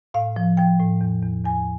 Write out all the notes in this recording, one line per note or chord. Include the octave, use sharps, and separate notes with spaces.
A2 F5
F3
F3 G5
A2
E2
E2
E2 G#5